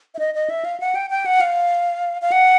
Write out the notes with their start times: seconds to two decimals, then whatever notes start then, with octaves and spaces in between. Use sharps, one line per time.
0.15 E5
0.19 D#5
0.35 D#5
0.50 E5
0.65 F5
0.80 F#5
0.95 G5
1.10 G5
1.26 F#5
1.41 F5
2.22 F5
2.32 F#5